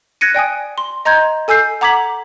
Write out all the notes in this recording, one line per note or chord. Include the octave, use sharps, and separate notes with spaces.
F#6 G#6 A#6 C#7 D#7
D5 G5 G#5 D#6
C6
D#5 A#5 C6 G6 G#6
A4 G#5 E6 G6 C7
F#5 A#5 D6 G#6 B6 F#7